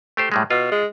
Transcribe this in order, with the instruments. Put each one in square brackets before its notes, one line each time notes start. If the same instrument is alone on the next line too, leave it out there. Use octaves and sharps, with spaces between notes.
[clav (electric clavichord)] A3 G4 C5
A2 G3 G#3
[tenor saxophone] B2 [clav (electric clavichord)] F4
[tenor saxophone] G#3